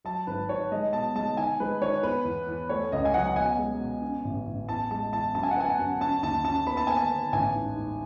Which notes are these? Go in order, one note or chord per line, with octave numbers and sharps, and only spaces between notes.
F#3 A5
G#1 B4
G#2 C#5
G#3 D#5
B2 A5
G#3 A5
D#3 G#5
G#3 B4
D#3 C#5
B3 B4
E2
E2
A3 C#5
C#2 D#5
G#5
F#3 F#5
B2 G#5
G#3
B2
C#4
A1
A1
E2 A5
G#3 A5
E2 A5
F#2 A5
G#5
F#5
B3 G#5
F#2
C#4 A5
D#2 A5
C#4 A5
B3 B5
A5
B3 G#5
A5
B3
A1 G#5
G#2
G#2